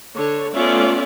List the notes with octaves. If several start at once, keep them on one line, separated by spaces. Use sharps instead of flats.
D3 C#5
A3 B3 C#4 F4 D5 E5